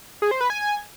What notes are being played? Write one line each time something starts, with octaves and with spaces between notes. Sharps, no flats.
G#4
C5
B4
G#5